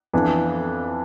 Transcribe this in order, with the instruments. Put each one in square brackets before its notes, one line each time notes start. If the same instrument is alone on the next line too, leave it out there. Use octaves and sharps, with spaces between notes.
[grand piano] F2 E3 B3 D4